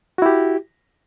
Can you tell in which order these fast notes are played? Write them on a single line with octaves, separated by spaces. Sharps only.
F#4 E4 G4